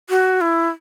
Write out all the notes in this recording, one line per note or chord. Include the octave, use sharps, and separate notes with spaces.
F#4
E4